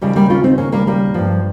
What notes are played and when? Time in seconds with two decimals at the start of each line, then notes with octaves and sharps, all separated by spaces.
0.01 D#2 C#3 F3 G3
0.16 G3 A#3
0.30 C#4 F4
0.44 C4 D#4
0.58 A#3 C#4
0.72 G3 A#3
0.87 G3 A#3
1.14 G2 F3